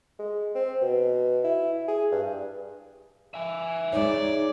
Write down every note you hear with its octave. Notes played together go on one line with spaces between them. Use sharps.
G#3
C4
B2
E4
G#4
G2
E5 G#5
G#3 D#4 C#5 D5